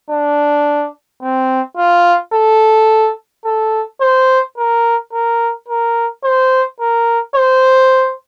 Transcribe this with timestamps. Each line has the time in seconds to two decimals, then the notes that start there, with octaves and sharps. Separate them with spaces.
0.10 D4
1.22 C4
1.77 F4
2.34 A4
3.45 A4
4.01 C5
4.57 A#4
5.13 A#4
5.69 A#4
6.24 C5
6.81 A#4
7.35 C5